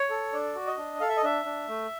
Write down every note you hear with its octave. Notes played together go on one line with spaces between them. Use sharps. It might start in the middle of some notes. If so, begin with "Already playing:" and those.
Already playing: C#5
A4
D4 D5
F#4
D#5
D4
A4 F5
E5
D#5
D4 E5
D4
A3